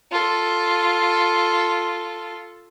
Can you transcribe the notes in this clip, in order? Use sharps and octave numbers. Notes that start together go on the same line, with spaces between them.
F4 A4